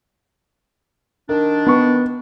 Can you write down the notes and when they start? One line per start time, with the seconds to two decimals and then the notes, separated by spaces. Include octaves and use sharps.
1.29 D#3 D4 A#4
1.67 B3 C#6